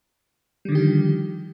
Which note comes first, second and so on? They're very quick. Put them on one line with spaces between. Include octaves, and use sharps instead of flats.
G3 D3 D#3 G4 F3